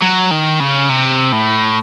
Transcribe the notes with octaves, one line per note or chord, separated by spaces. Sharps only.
F#3
D#3
C#3
C3
A2